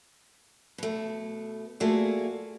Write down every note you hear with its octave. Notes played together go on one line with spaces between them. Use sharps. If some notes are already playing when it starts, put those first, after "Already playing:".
B2 A3
A3 A#3 F4 F#4 G#4 D5